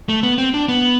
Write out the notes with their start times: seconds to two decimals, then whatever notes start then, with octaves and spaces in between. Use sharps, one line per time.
0.09 A3
0.23 B3
0.38 C4
0.54 D4
0.68 B3